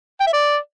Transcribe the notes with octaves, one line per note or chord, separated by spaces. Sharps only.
G5
E5
D5